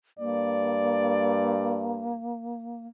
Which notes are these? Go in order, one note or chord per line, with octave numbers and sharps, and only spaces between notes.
G2 A#3 D5